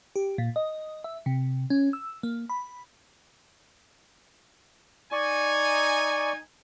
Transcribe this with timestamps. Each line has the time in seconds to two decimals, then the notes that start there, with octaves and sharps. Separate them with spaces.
0.16 G4
0.38 A#2
0.56 D#5
1.04 E5
1.26 C3
1.70 C#4
1.93 E6
2.23 A#3
2.49 B5
5.12 D#4 D5 G#5 C#6